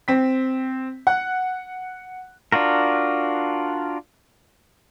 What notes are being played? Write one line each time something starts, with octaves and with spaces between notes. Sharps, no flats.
C4 B6
F#5 F#6
D4 F4 F#4 A#4